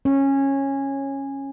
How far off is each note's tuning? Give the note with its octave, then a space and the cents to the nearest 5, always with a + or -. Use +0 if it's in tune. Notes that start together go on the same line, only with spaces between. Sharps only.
C#4 -15